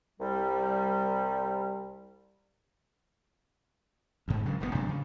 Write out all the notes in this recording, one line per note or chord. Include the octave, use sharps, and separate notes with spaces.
C2 G3
D2 G#2
G2 C#3 F#3
E1 A1 G2 B3
A2 C3 F#3 D4
C#3